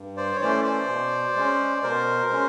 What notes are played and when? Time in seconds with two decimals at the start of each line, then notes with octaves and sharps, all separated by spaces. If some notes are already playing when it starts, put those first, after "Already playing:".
Already playing: G2
0.17 C5 D5
0.36 C#5
0.40 E3 A3 C#4 C5 D5
0.64 C5 D5
0.88 B2
1.36 G#3 C#4
1.83 B2 A#4 C5
2.31 G#3 C#4